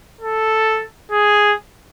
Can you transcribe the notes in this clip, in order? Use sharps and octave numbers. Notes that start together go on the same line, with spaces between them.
A4
G#4